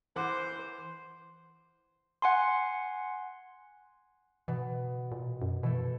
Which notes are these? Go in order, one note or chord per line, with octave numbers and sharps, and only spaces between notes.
E3 C5 F#5 D6
F#5 G#5 C6
B2 E3
A#2
F#2
B2 E3 A3